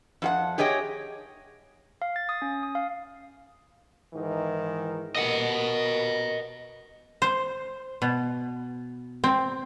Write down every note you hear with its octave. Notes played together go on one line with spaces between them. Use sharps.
F2 F#4 F#5
G4 G#4 C#5 D#5 G5
F5
A6
D#6
C#4
D#6
F5
G#2 D#3 E3
B2 A#4 D#5 F#5
C5
B2
C4